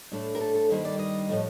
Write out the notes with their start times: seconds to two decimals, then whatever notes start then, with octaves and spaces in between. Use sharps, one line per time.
0.12 A2 A3 D4
0.35 A#4
0.41 A4
0.55 A4
0.70 G2 D#3 G3 A#3 D4 C5
0.85 D5
0.99 D#5
1.29 A2 F3 A3